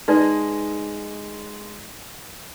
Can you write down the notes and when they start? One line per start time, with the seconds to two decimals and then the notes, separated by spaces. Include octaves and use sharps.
0.08 G#3 D#4 B4 D5 D#5